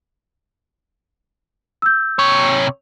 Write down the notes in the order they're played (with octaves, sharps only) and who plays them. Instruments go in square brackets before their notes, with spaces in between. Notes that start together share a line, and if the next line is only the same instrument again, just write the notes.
[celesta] E6 G6
[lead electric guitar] C3 C#5